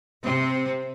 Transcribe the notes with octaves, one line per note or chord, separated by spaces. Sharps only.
C3 C4